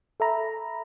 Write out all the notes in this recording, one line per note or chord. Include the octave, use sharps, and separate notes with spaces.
A4 E5 A#5 B5